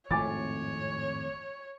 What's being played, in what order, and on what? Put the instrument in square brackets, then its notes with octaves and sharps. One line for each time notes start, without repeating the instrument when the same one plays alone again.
[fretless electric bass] G#1 F2 A2 [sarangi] C#5 [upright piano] G#5 D6 A6